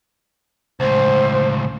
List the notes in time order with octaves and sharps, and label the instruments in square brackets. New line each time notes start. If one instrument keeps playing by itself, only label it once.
[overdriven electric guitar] C#2 A2 [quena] C5